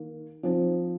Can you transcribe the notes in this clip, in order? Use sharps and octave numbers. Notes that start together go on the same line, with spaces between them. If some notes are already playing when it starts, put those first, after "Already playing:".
Already playing: D#3 A#3
F3 C4 D#4